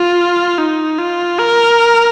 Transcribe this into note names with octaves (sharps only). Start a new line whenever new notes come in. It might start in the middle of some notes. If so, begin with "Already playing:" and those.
Already playing: F4
D#4
F4
A#4